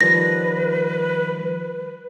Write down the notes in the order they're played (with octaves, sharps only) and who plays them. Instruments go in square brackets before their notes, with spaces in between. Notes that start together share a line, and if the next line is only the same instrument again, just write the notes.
[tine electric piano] D#3 F3 G3 [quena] B4 [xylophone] A#6